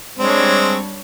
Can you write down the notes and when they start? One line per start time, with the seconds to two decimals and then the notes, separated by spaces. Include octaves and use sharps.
0.19 G3 G#3 C4 D4 C#5